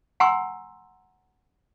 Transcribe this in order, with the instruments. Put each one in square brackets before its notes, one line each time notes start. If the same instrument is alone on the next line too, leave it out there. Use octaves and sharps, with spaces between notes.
[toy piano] F#5 G#5 A#5 C6 C#6 E6